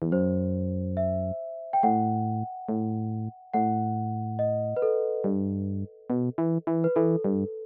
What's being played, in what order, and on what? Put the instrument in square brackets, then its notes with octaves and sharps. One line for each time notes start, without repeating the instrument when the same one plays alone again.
[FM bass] E2
[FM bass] F#2 [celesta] C5
[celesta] E5
G5
[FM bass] A2 [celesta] F#5
[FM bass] A2
[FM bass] A2 [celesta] F#5
[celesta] D#5
B4
A4
[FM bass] G2
B2
E3
E3
[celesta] B4
[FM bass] E3 [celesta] A4
[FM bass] G2